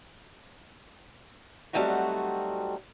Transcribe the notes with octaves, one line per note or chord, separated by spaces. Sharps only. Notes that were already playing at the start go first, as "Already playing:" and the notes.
F#3 G3 A3 C4 D#4 F#4